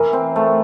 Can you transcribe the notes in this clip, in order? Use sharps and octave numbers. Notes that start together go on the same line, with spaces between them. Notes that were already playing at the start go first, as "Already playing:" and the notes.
Already playing: E3 A#4
C4
A3